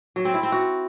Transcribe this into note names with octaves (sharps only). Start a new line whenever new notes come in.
F#3
C4
E4
C4
F#4